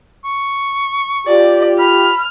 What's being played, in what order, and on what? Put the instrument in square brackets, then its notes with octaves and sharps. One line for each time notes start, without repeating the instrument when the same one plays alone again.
[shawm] C#6
[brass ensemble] F4 G4 [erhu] D5
[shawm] B5 [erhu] F6